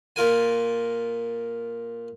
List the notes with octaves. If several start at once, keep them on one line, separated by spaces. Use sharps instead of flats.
A#2 F4 A#4 G#5